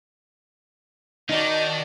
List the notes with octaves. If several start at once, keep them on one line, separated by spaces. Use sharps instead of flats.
D#3 D#4 F#4 D5 A5